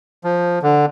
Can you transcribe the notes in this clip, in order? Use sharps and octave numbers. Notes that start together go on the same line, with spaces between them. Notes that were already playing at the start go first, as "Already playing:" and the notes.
F3
D3